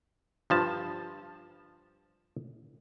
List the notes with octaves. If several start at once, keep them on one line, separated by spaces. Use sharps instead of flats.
G2 F3 A5